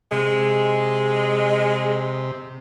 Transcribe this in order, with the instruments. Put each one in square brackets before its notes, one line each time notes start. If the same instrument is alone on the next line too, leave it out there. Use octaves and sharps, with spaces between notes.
[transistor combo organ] C3 [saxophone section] G#3